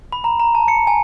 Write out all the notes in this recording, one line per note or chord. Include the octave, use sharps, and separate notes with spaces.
B5
A#5
A#5
A5
C#7
G#5